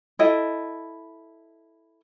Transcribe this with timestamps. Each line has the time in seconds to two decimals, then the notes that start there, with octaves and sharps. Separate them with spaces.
0.19 E4 A4 D#5 G5